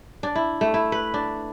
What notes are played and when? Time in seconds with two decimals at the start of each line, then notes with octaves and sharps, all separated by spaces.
0.23 D4
0.35 E4
0.61 A3
0.74 E4
0.92 B4
1.14 D4